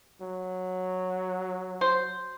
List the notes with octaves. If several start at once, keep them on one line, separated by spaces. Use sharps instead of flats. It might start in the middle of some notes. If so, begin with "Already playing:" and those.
F#3
C5